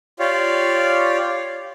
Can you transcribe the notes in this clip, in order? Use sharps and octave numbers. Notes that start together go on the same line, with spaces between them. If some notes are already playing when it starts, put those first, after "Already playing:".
F4 G4 C#5 D5 F5